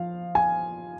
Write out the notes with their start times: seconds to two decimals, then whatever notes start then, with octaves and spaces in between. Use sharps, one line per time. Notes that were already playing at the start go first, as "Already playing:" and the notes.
Already playing: F3 F5
0.35 G#5